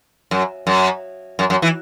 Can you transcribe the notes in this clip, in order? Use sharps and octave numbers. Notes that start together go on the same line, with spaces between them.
F#2
F#2
F#2
F#2
E3